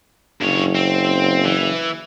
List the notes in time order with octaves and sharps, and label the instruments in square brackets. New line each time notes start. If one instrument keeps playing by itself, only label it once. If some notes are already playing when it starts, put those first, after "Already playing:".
[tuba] F#1 [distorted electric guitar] G2 C#5
[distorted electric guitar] C4
E3